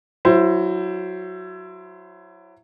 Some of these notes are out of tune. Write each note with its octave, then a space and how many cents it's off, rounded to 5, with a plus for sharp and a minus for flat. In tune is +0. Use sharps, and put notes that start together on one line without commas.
F#3 +0 E4 +25 C5 +0